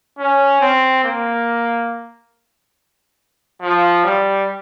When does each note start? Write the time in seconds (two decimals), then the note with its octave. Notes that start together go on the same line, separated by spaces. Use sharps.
0.19 C#4
0.62 C4
1.04 A#3
3.62 F3
4.04 G3